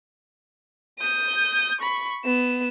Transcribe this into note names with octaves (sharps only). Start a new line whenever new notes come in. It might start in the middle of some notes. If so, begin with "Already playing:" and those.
D#6 G6
B5 C#6
B3 E7